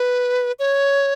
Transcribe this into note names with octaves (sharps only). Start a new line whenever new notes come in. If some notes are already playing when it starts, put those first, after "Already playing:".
Already playing: B4
C#5